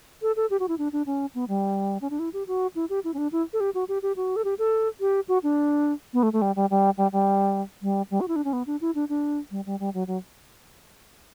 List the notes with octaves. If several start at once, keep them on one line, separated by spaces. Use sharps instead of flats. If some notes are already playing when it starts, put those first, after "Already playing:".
A4
A4
G4
F#4
E4
D4
D4
C#4
B3
G3
C#4
D4
E4
G4
F#4
E4
G4
E4
C#4
D4
E4
A4
G4
F#4
G4
G4
F#4
A4
G4
A4
G4
F#4
D4
B3
A3
A3
G3
G3
G3
G3
G3
G3
G3
F#4
E4
D4
C#4
B3
D4
E4
D4
D4
G3
G3
G3
F#3
F#3